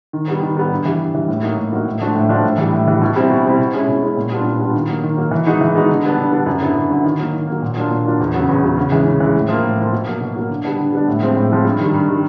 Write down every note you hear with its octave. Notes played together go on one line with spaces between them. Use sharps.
D#3
G3 B3
D#3
G3 B3
G2
E3 G3
G2
E3 G3
A2
F#3 A#3 D#4 F#4
A2
F#3 A#3 D#4 F#4
A2
F3 A3 D4 F#4
A2
F3 A3 D4 F#4
A2
E3 G3
A2
E3 G3
B2
G3 C4 E4
B2
G3 C4 E4
B2
G#3 C#4 E4
B2
G#3 C#4 E4
A#2
G3 B3 D4 F4
A#2
G3 B3 D4 F4
D#3
F#3 A#3
D#3
F#3 A#3
E3
G#3 B3 D#4 F#4
E3
G#3 B3 D#4 F#4
D3
G3 B3 D4
D3
G3 B3 D4
F#2
D3 F#3 B3 E4
F#2
D3 F#3 B3 E4
D#3
F#3 A#3
D#3
F#3 A#3
A#2
F#3 A#3 D4 F4
A#2
F#3 A#3 D4 F4
E2
C#3 F#3 B3
E2
C#3 F#3 B3
C#3
E3 G#3
C#3
E3 G#3
A2
F3 A#3
A2
F3 A#3
B2
F#3 A#3
B2
F#3 A#3
D3
G3 B3 D4
D3
G3 B3 D4
A2
F3 G#3 C4
A2
F3 G#3 C4
G2
D#3 G3
G2
D#3 G3